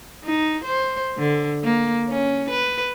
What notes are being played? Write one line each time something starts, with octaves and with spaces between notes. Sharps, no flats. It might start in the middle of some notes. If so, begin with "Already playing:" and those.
D#4
C5
D3
A#3
C#4
B4